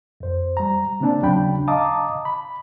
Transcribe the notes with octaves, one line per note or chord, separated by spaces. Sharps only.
F2 C5
G3 A#5
C#3 A#3 C4 D4 D5 A5
D#2 C#3 F#3 D4 G5 B5
D#5 F5 A5 A#5 D6 D#6
B5